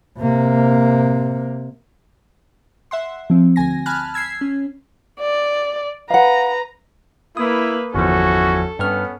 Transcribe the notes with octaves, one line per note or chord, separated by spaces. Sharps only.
C3 A#3
E5 F#5 C6
F3 C4
D2 G#5 A#6
G#5 A5 B5 F6 F#6
E6 G#6 B6 C7
C#4
D5
B4 F5 F#5 A#5
A#3 E4 B4 D#6
G1 E2 F3 C#4 E4 F#4 A4
G2 B3 C#4 B4 F6